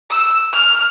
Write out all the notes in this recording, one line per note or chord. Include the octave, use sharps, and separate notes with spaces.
E6
F6